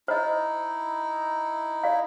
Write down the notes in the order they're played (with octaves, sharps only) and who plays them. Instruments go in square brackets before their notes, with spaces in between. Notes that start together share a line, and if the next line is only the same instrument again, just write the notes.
[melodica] D#4 E4 [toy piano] C5 D#5
[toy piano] D5 F5